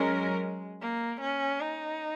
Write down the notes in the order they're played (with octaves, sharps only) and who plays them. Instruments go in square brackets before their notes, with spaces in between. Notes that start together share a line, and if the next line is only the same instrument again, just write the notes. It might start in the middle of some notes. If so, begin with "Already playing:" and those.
Already playing: [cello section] F#3 C#4 A#4 [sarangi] G#3
[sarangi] A#3
C#4
D#4